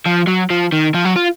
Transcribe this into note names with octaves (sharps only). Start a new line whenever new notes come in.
F3
F#3
F3
D#3
F3
F#3
F4